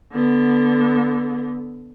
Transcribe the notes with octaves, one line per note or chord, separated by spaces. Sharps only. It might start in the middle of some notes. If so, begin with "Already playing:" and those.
D3 B3